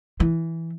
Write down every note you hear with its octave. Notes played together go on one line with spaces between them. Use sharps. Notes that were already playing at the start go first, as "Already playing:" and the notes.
E3